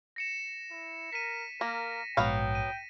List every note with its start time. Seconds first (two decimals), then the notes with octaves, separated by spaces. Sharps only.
0.16 A#6 C#7 E7
0.71 E4
1.13 A#4 B6 D#7
1.61 A#3 A#4 A#6
2.17 A#1 G#2 F#3 B3 F5 G5
2.55 D#7